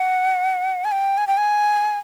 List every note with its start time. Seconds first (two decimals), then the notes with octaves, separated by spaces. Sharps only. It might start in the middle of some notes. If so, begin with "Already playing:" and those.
Already playing: F#5
0.85 G#5
0.92 G5
1.18 G#5
1.27 G5
1.37 G#5